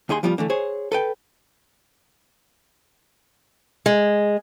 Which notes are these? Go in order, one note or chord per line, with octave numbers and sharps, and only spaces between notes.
D#2 D#3 G#4 C6
F3 G3 B3 F4
D3 E3 A3
G#4 C5 C#5
A4 B4 G5
G#3